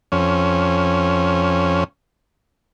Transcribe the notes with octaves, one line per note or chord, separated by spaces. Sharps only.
F2 C#4